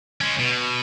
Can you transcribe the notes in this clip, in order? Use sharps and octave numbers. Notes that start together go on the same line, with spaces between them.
G#3 C#4
B2